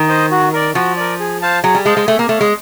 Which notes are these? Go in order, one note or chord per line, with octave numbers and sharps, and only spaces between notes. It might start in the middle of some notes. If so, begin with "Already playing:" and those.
Already playing: D#3
C5 D#5
F#4
A#4 D5
F3 F#4
A#4 D5
G#4
C5 F5 A5
F#3 G#4
G3
G#3 C5 F5 A5
G#3
A3 G#4
A#3
A3 C#5 F5
G#3